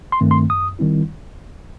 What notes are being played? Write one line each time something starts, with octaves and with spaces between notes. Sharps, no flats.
C6
G2 D#3 A3 C4
C6
F#2 D#6
D#3 G3 C4 E4